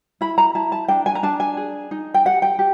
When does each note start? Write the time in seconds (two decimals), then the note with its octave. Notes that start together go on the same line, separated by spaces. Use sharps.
0.21 E4 B5
0.38 A#5
0.55 E4 A5
0.72 A5
0.88 D4 G5
1.06 G#5
1.15 A#5
1.23 D4 A5
1.40 G#5
1.57 G#4
1.91 D#4
2.14 G5
2.25 G4 F#5
2.42 G5
2.59 G4